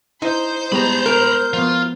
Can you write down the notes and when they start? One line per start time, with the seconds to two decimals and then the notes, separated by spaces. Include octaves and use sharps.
0.22 D#4 E4 C5 G6
0.72 G3 G#3 B3 A#5 B5
1.06 A#4
1.54 F3 B3 F4